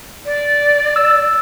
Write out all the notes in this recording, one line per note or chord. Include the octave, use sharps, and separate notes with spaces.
D5
E6